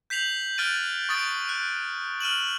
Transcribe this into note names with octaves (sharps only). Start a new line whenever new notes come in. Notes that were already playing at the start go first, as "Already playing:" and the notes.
G6 B6 C7 F7 F#7
F6 F#6 A6 D7 D#7
C#6 D#6 A6 D7
F#6
F6 D#7 E7 F#7